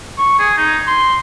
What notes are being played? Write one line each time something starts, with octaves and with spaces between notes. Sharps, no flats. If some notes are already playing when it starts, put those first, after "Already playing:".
C#6
G#4
D#4
C6